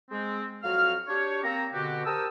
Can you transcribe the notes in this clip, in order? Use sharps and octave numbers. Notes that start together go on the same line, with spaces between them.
G#3 C4
F2 F#3 F#4 F5 F6
D4 G4 C#5
A#3 C4 A#5
B2 D3 F#4 G4
G4 A#4 C5 A5 D#6 E6